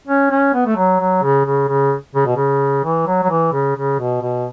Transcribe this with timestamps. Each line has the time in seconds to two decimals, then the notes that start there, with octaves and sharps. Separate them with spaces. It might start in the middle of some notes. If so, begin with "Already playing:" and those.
0.07 C#4
0.31 C#4
0.54 B3
0.66 A3
0.77 F#3
1.00 F#3
1.23 C#3
1.45 C#3
1.69 C#3
2.15 C#3
2.26 B2
2.37 C#3
2.84 E3
3.07 F#3
3.23 F#3
3.30 E3
3.53 C#3
3.76 C#3
3.99 B2
4.22 B2